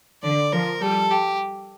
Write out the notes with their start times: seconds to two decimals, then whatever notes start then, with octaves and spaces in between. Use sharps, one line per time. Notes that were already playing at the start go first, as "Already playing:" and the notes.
0.23 D3 D5
0.52 F3 A#4
0.82 G3 A4
1.11 G4